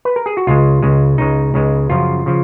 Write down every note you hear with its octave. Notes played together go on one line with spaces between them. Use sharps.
B4
A#4
G#4
F#4
C#2 C#3 G#3 F4
C#2 C#3 G#3
C#2 C#3 G#3 D#4
C#2 C#3 G#3
F#2 C#3 F3 F4
C#3 F3